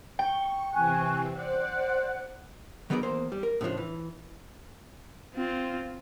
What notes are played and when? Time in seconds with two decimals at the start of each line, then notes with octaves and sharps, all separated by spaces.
0.19 G5 C#6
0.73 C3 E3 C4 G#5 C#6 F#6
1.33 C5 D5 F#5 F#6
2.90 D#3 F#3 B3 G#4 C#5 D5
3.03 E2 A#3 C5
3.32 G3
3.43 A#4
3.61 A2 C#3 E3 F3 D4
3.77 E3
5.34 C4 F4